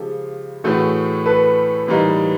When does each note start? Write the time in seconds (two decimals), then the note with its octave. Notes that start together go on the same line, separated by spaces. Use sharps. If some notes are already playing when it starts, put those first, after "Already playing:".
Already playing: C#3 F3 G#3 G4 A4
0.64 A2 E3 A3 F#4 G#4
1.26 A4 B4
1.88 A2 E3 G3 A#3 D#4